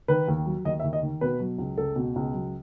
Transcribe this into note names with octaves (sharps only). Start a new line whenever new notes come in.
D#3 B4
D#2
F#3
D#2 D#5
E5
D#2
D#5
D#3
B2 B4
F#3
C#2
C#2 A4
B2
C#2
F#3